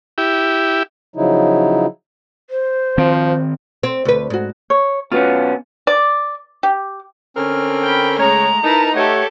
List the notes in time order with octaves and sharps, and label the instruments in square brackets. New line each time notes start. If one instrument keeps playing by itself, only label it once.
[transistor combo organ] E4 G4
[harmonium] C#3 F3 F#3 D#4 E4
[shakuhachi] C5
[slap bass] D#3 C4 [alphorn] F3
[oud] C4
D2 B4
G#2 F#4
[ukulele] C#5
[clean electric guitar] B2 B3 C#4 [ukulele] F4
[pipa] D5
G4
[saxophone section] D3 C4 A#4 [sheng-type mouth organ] C#4 F6
[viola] G5 B5
[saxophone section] C#3 C#5 [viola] G#3 A3 [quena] A#5
[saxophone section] D#4 [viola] E4 B4 [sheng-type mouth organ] A#4 A5
[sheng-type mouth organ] A3 F#5 [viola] G4 A4 [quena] C#5